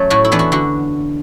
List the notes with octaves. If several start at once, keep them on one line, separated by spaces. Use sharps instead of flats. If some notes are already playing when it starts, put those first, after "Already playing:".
Already playing: F#3 A3 C#4 C#5
A2 F#4
E4
E3 B3 D4
F#4
D3 F#4